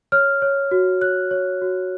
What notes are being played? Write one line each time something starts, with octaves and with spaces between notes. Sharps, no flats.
C#5 F6
C#5
F#4
C#5 F#6
C#5
F#4